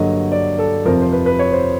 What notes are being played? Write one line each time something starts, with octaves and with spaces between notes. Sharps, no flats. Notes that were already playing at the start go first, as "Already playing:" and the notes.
Already playing: G2 D3 F#3 A#3 D#5
D5
A4
F2 C3 F3 A#4
C5
B4
B4
C#5
C5